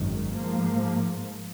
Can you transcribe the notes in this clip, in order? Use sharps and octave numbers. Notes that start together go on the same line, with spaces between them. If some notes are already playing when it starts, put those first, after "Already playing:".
Already playing: G#1 F#2 D#3
G#2 F3 A#3